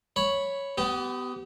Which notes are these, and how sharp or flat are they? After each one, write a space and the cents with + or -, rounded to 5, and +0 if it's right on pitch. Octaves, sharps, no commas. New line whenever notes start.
C#5 +0 B5 +0
B3 +20 G4 -25